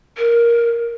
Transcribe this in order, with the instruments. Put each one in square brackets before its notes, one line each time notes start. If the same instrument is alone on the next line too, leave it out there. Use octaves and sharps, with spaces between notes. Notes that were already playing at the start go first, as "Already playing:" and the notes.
[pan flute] A#4